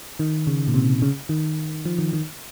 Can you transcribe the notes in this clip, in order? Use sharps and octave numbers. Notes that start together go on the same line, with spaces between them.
D#3
C#3
A#2
C3
C#3
D#3
F3
D#3
D#3